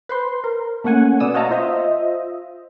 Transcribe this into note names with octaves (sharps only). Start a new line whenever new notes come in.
B4 C5 C6
A#4
A3 A#3 C#4 F#5 G#5
B2 B3 D5 D#6 E6
F#4 C#5 D#5 F5 A5 A#5
F4 C5 D#5 E5